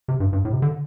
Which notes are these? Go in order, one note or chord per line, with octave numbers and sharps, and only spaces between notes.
C3
G2
G2
A2
C3
D3